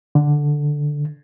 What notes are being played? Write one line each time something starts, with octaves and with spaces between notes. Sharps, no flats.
D3